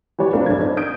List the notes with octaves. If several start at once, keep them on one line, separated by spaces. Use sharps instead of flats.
E3 G3 G4 B4 C#5 D5
A3 C4 D4 F4 A#4 B4
A#1 G2 G#6
C4 D#4
D#6 G6 D7